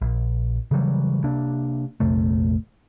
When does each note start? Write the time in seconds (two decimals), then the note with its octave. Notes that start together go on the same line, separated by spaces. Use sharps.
0.02 A#1
0.71 C#3 E3 F#3 G3
1.24 C3 A#3 D4
2.00 A#1 F2 C3 A3